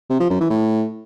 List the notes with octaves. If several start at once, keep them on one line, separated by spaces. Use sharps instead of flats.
C3
F3
F#2
E3
A2